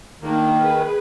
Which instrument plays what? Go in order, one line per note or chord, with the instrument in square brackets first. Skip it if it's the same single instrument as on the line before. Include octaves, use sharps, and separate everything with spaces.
[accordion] D#3 [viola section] A#3 D4
[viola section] G#4 B4